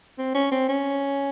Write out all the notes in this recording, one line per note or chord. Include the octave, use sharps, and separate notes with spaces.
C4
C#4
C4
C#4